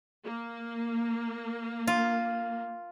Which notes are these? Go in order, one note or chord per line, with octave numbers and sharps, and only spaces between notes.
A#3
F4